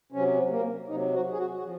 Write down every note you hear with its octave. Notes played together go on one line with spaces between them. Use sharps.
C3 F#3 C#4
A#3
C3 D#4
F#3
F#4
G#4
F#4
F#4
F3